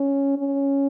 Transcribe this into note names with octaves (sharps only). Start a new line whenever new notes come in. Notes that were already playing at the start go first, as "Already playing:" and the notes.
Already playing: C#4
C#4